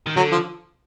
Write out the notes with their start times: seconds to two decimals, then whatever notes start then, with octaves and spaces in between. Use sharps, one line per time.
0.07 D#3
0.16 D3 F#3
0.32 F3